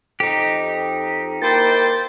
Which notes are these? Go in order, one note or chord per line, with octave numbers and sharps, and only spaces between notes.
F2 D#4 G4
A#3 E4 C5 G5 A6